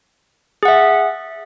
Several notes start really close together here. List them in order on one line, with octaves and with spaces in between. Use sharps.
G#4 F#5 E5